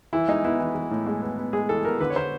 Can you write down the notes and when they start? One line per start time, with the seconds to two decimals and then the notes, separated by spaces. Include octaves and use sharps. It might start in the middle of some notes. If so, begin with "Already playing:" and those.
0.13 E3 E4
0.28 G#3 D#4
0.44 B3 E4
0.60 E3
0.75 E3
0.91 A2
1.06 G#3
1.22 B3
1.38 B3
1.53 G#3 G#4
1.69 E3 A4
1.85 B3 A#4
2.00 D3 B4
2.10 C#5
2.15 D3 C5